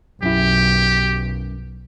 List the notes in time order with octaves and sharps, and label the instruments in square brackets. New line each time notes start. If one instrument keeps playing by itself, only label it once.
[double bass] B1 [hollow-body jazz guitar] F#2 E4 [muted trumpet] G4